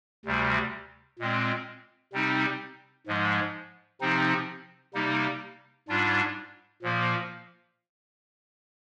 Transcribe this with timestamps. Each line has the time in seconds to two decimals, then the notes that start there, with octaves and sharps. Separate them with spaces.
0.25 D2 C3 G3
1.19 A#2 G#3 C4
2.13 C3 G3 C4 D#4
3.07 G#2 F3 G#3
4.01 C3 F3 C4 D#4
4.94 C3 G3 A#3 D#4
5.88 G#2 G3 D4 F4
6.82 A#2 F3 A#3